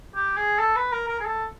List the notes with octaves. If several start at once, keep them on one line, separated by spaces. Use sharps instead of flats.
G4
G#4
A4
B4
A#4
A#4
G#4
A4